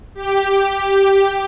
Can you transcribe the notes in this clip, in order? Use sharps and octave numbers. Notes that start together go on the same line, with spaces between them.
G4